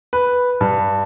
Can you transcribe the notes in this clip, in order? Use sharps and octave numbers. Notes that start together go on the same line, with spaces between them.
B4
G2